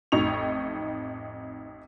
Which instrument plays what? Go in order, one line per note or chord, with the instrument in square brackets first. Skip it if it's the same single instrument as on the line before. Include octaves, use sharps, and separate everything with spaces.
[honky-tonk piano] A1 F2 D#4 C#6 F7